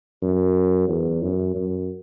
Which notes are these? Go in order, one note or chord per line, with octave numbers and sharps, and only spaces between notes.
F#2
E2
F#2
F#2